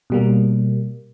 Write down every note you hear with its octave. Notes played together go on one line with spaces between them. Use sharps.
B2 G3 A#3